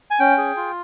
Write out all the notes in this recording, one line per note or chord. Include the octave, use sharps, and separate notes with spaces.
G#5
C#4 G5
G#4
F4